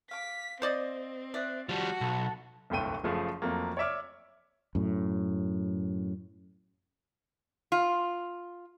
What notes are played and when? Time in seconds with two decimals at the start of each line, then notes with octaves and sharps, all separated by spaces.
0.11 F5 D6 B6
0.62 C4 C5 D5 D#5
1.34 D5 E5 D#6 F#6
1.69 F3 G3 D4 F#4
2.01 B1 A4
2.70 D1 G1 C2 A3 G5 D#7
3.04 F#1 F3 A3 G#4
3.42 F2 F#3 A3 A#3
3.77 C#5 D5 E5 D6 F6
4.75 F#2 A2
7.72 F4